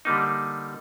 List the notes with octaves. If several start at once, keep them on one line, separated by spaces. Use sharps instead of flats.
D3 G3 A#3 D#4